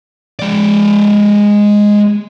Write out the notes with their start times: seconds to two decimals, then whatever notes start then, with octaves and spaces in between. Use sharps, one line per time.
0.39 G#3 D5